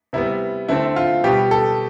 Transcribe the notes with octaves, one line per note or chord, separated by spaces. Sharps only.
C3 G3 B3 E4
D3 A3 C4 E4
F4
B2 G3 B3 G4
A4